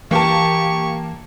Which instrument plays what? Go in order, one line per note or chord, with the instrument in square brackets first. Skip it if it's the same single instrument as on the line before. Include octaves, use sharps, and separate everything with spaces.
[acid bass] E3 [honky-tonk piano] A#3 A5 [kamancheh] G4 C#6